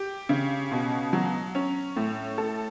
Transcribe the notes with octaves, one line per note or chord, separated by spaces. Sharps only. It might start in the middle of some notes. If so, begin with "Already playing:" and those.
Already playing: G4
C#3
B2
F#3
C#4
A2
A4